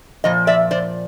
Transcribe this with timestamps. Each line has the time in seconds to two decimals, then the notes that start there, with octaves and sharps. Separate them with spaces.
0.24 A#2 F3 D#5
0.47 D5 E5
0.71 C5 D5